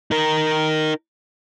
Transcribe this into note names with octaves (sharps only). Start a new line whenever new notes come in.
D#4 A#4